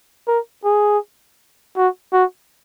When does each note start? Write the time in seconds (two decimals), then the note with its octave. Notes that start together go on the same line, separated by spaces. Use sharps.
0.28 A#4
0.64 G#4
1.77 F#4
2.13 F#4